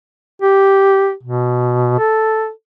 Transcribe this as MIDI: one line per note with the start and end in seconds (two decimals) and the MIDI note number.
0.42 1.14 67
1.23 1.95 47
1.99 2.50 69